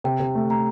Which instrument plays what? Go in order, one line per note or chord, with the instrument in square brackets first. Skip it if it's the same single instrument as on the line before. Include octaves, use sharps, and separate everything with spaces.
[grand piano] C3 [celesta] G5
[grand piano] C3
A3
[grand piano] A3 [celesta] A#5